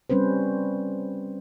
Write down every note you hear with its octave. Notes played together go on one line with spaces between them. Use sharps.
G3 C4 C#4 B4 C5